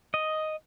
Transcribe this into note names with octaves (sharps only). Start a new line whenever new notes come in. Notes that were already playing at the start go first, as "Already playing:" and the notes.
D#5